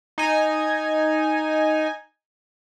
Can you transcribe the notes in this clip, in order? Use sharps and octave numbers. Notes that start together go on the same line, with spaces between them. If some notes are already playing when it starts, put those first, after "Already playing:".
D#4 G#5